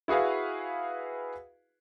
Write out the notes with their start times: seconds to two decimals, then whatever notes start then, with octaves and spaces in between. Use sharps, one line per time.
0.08 E4 F#4 G#4 B4 F5